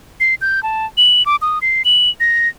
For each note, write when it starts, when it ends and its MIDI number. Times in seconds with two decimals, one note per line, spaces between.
0.20 0.35 96
0.41 0.62 91
0.63 0.86 81
0.97 1.25 102
1.26 1.36 86
1.42 1.59 87
1.62 1.82 96
1.85 2.10 102
2.20 2.49 94